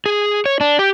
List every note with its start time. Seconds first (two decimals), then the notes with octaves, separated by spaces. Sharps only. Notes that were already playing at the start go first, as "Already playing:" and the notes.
0.06 G#4
0.46 C#5
0.61 D4
0.79 G4